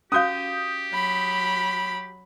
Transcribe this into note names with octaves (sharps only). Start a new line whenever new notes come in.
C#4 F#4 G4 F5 D#6 G6
F#3 B5